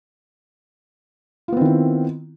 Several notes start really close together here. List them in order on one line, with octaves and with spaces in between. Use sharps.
F4 B3 C4 D#3 E4